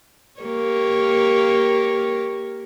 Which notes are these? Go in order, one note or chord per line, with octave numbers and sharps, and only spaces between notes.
A#3 G4 C#5